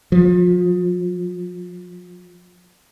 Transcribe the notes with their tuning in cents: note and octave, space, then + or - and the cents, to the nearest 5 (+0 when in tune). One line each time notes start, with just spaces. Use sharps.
F3 +35